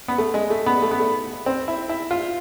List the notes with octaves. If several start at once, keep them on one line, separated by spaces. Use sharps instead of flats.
B3
A3
G#3
A3
B3
A3
B3
A3
C4
E4
E4
F4